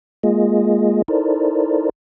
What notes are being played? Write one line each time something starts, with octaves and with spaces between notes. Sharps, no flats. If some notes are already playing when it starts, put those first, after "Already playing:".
G#3 A#3 F4 G#4 D#5
D#4 E4 A4 A#4 C5 D5